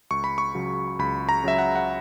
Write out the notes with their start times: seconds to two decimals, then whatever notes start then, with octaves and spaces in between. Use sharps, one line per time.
0.10 C#2 C#6
0.24 B5
0.38 C#6
0.55 C#3 F#3
0.99 C#2 B5
1.29 A#5
1.44 C#3 F#3 E5
1.58 F#5
1.76 F#5